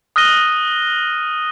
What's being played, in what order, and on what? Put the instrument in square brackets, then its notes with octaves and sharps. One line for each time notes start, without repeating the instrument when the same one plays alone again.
[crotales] D#6 F6 F#6 A#6 D#7 G7